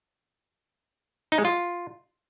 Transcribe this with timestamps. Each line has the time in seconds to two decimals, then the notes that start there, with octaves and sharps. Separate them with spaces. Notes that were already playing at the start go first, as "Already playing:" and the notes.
1.32 D#4
1.38 G#3
1.45 F4